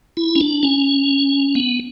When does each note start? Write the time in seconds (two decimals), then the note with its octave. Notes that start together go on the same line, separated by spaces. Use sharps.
0.17 E4
0.35 C#4
0.41 D4
0.63 C#4
1.55 B3